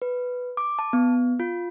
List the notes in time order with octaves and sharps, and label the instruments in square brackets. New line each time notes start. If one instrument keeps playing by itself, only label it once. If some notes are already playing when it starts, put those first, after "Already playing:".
[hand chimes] B4
D6
A5
B3
F4